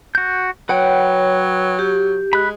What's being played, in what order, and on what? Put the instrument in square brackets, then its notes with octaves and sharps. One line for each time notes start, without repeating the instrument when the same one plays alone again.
[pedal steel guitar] F#4 G6
[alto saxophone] F#3 [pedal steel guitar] B4 F#5 G5 [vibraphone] C#5
[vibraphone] G4
[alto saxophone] G#3 [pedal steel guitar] B5 F#6